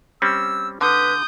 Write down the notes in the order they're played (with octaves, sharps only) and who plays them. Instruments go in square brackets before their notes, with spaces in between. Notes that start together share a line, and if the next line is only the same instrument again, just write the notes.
[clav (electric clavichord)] G3 C4 C#4 [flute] E6
[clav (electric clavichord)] D3 [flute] B4 [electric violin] D#6 G6